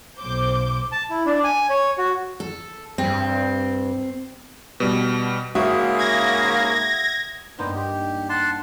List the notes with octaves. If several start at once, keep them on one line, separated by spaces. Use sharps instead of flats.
B1 C5 D6 G6
A5
E4
D4
G#5
C#5
F#4
A4
G2 C4
B2 G3
G#2 C#3 A#3 F#4 E5 F#5 D#6
G#6 A#6
G2 A#3 B3 D#4 C5
G4
F#5 A5 C6